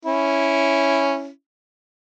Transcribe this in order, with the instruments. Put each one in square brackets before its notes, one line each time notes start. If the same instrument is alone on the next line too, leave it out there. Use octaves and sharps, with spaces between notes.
[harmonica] C#4 E4